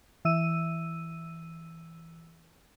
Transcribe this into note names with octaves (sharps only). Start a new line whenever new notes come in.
E3 E6 D#7